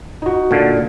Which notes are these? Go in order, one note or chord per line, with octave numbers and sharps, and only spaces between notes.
D#4 F#4
A#2 D3